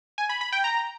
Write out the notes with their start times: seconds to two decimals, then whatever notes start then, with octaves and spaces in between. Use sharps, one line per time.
0.18 G#5
0.29 B5
0.41 B5
0.52 G5
0.64 A#5